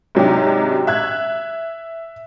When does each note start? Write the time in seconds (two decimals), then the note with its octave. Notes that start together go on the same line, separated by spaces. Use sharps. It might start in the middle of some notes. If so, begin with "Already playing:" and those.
0.15 G#2 C3 F#3 D4 D#4 G4
0.87 E5 F#6 G#6